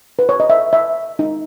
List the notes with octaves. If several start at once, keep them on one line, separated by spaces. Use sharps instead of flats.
B4
C#5
D#5
E5
E5
D#4